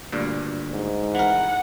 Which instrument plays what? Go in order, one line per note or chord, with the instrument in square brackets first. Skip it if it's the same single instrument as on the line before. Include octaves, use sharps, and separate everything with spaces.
[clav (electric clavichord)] D2 G2 A#2
[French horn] G#2
[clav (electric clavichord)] E3 A#4 [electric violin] F#5